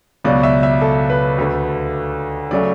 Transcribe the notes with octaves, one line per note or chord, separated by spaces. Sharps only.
C#2 B2 F#3 D5
E5
E5
A4
B4
D2 D3 A3
C#3 F#3 A3 D5